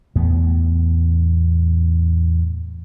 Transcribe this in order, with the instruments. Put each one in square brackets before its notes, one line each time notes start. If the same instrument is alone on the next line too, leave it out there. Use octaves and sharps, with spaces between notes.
[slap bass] E2 A2 B3